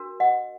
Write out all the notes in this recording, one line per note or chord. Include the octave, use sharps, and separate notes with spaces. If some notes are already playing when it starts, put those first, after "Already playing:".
Already playing: D4 F#4 A#4
D#5 F#5